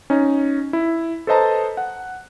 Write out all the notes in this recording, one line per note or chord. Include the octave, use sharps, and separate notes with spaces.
C#4 D#4
E4
A4 B4 C5 D#5 A5 A#5
F#5